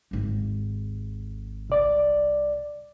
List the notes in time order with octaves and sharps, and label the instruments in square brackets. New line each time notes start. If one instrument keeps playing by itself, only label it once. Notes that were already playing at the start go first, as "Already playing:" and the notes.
[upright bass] G#1 D#2
[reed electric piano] C2 D5